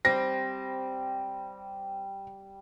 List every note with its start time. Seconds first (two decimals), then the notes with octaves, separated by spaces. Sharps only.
0.05 G3 C4 A#6